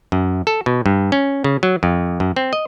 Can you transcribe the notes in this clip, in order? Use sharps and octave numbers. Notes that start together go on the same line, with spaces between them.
F#2
A4
B2
G2
C#4
C#3
F#3
F2
F#2
C4
D#5